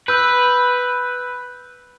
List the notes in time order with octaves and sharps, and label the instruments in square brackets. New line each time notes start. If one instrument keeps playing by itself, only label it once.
[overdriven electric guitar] B4 [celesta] E6 G6